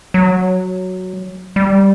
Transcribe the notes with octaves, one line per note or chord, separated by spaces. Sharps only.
F#3
G3